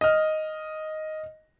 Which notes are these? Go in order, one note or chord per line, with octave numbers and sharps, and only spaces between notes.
D#5 F6